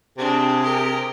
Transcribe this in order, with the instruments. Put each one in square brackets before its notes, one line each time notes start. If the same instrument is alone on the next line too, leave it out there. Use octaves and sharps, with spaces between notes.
[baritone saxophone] C3 [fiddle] C4 D4 [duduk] G#4
[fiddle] G4 A#4